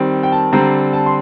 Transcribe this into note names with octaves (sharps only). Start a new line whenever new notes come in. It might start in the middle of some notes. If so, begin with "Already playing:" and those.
Already playing: D#3 G3 C4
G5
A5
D3 G3 C4 A#5
A5
C6